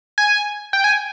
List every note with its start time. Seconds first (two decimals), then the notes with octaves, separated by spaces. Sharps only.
0.18 G#5
0.73 G5
0.84 G#5